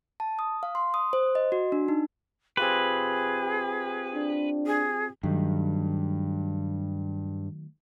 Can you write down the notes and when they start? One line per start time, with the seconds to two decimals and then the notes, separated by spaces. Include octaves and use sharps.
0.20 A5
0.39 D#6
0.63 F5
0.75 C6
0.94 D#6
1.13 C5
1.35 D#5
1.52 F#4
1.72 D4
1.88 D#4
2.57 C4 F4 G4 G#4 B4
4.14 D4
4.66 G#4
5.23 G2 D#3 F#3 A3